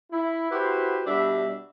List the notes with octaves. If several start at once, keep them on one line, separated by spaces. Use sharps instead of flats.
E4
E4 F#4 G4 B4 C5
B2 G3 D4 E5